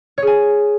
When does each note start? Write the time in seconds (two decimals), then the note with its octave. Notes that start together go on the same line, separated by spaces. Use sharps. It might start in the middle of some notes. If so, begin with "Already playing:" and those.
0.18 C#5
0.22 G#4
0.27 G#5